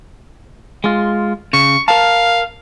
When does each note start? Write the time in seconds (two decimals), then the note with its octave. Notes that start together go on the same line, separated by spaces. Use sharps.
0.84 G#3 F4
1.53 C#3 C#6
1.88 A#4 F5 A5